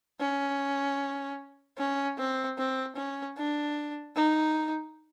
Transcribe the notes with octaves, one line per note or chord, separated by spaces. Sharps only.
C#4
C#4
C4
C4
C#4
D4
D#4